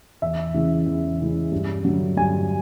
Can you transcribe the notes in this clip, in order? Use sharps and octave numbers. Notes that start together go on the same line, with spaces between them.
E2 E5
C#3 E3 G#3
E2
C#3 E3 G#3
G2
D3 F#3
G2 G#5